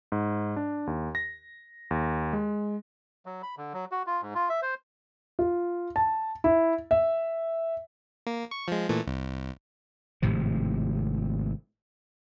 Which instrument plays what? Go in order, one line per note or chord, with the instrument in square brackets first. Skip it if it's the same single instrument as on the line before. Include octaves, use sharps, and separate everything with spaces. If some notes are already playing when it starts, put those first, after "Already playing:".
[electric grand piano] G#2
D4
D#2
A#6
D#2
G#3
[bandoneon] F#3
B5
D3
F#3
F#4
F4
G#2
F4
E5
C5
[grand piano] F4
A5
E4
E5
[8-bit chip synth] A#3
C#6
F3 G#3
A#2 E3 A3
C2
[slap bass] G#1 A2 C3 F3